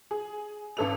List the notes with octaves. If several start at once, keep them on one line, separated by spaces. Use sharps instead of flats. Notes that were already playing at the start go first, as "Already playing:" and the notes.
G#4
G#1 C#4 A4 B4 F7